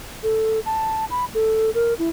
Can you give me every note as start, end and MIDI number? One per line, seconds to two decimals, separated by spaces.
0.23 0.60 69
0.66 1.05 81
1.11 1.25 83
1.34 1.71 69
1.75 1.94 70
1.99 2.10 64